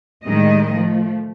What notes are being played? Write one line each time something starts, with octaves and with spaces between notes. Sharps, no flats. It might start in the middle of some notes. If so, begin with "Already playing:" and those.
A2 D#3 G3 G#3 D#5
F3 A3